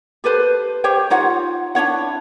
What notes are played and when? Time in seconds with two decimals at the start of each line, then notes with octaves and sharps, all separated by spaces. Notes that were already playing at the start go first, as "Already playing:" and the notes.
0.24 G4 A4 B4 C5
0.84 G4 C5 C#5 G5
1.10 D#4 F4 C#5 F#5
1.75 D4 E4 C#5 F#5